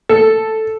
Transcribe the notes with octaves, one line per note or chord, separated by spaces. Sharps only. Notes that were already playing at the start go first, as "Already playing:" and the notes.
A4